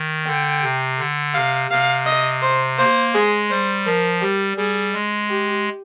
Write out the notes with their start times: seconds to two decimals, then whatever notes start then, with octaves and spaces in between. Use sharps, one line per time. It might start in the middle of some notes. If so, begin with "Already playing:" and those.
Already playing: D#3
0.27 D3 G5
0.63 C3
0.99 D3
1.34 C3 F5
1.71 C3 F5
2.06 D#5
2.42 C5
2.78 A#3 C5
3.13 G#3 G#4
3.50 G3 C5
3.86 F3 A#4
4.21 G3 G4
4.57 G3 G#4
4.94 G#3
5.30 G4